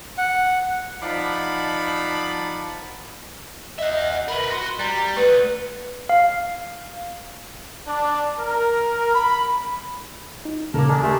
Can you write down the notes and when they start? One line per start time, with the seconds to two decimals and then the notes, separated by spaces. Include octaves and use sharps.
0.18 F#5
1.02 F3 D#4 D5 F#5 A5 B5
3.79 D#5 E5 F#5
4.28 A#4 B4 B5
4.50 F#4 C6
4.79 G3 A#5
5.17 A3 B4 F#5
6.09 F5
7.87 D4
8.40 A#4
9.14 B5
10.45 D#4
10.74 D#2 A#2 C#3 A#3 A4 A#4
10.89 G#3 D4
11.03 A3 E4 G4 C6